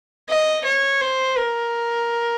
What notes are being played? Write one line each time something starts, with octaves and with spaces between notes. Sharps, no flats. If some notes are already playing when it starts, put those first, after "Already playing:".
D#5
C#5
C5
A#4